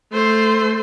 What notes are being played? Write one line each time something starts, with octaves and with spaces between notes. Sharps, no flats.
A3 C5